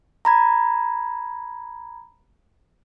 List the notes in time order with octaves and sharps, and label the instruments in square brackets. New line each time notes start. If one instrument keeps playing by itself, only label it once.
[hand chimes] A#5 B5 G#6